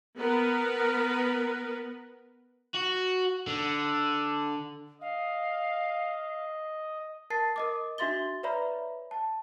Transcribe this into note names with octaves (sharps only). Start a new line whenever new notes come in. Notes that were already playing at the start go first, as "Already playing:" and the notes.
B3 A#4 B4
F#4
D3
D#5 F5
A#4 A5 A6 C7
A#4 D#5 D6
D4 F#4 E5 C6 A6 G7
B4 C#5 D5 E5 A#5 B5
A5